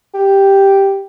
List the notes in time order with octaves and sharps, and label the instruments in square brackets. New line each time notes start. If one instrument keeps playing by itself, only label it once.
[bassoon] G4